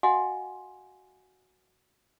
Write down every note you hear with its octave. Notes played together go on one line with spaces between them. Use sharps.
F#4 D#5 F5 F#5 G#5 C6